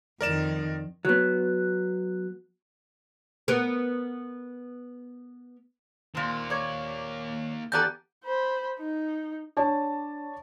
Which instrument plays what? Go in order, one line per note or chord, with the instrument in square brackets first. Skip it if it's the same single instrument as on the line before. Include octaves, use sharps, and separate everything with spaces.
[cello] F2 D#3 [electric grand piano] A#4 D5 E7
[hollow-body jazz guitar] F#3 B3
[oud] B3 A#4
[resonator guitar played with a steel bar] A#2 C4 [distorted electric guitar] D#3 A#3
[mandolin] C#5 D5
[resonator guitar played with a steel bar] E3 B3 G4 [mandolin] A4 D5 A5 [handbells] A#5 G6
[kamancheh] C5 B5
D#4
[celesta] D4 [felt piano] C#5 D5 A5